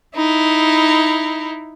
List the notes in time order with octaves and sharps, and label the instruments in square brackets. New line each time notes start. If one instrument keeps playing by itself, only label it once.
[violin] D#4 E4